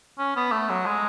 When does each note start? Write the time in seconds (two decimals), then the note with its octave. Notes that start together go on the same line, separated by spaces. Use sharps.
0.19 C#4
0.36 B3
0.52 A3
0.69 F#3
0.86 G#3